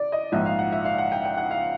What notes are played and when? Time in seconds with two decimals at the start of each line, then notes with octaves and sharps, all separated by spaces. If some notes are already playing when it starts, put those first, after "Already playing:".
Already playing: D5
0.12 D#5
0.32 A#1 G#2 F3 E5
0.46 F5
0.59 F#5
0.72 E5
0.85 F5
0.98 F#5
1.12 G5
1.25 G5
1.38 F#5
1.51 F5